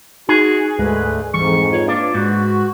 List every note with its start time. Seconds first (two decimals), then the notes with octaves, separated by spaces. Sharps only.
0.29 D#4 F#4 G#4
0.79 D2 G#2 D3 G#3 A3 B4
1.34 F2 G#2 E3 G3 C#6
1.73 F4 B4 C#5
1.88 A#3 D4
2.14 G#2 F#4 B4 A6